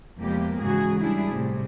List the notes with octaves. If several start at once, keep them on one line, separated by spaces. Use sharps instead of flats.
F2 C3 G#3 A#3 B3 G4
G#2 C#3 E3 F#4 G#4
G3 D4 E4 G#4
A2 C3 G3